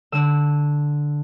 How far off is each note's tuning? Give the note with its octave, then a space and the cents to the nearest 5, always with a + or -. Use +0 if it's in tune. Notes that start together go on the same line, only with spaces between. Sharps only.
D3 +0 E6 -15